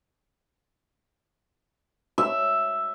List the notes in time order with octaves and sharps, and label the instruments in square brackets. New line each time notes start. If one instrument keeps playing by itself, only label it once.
[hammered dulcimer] E5